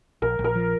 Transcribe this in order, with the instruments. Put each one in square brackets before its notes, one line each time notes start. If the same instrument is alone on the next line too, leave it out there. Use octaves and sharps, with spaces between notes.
[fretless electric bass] A#1 [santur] A#4
[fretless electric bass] A#1
[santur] A#4
[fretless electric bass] F3